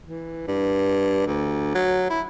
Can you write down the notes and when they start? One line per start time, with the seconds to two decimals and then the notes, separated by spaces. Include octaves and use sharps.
0.06 E3
0.47 G2
1.27 D2
1.74 F#3
2.10 E4